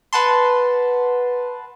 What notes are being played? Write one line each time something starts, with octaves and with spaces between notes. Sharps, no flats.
B4 F#5 A5 C6